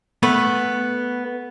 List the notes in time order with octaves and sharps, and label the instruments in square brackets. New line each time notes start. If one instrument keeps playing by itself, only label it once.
[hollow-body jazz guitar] A3 B3 B4